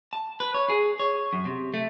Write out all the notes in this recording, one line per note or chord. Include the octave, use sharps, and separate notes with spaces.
A5
B4
C#5
G#4
C#5
F#2
C3
A3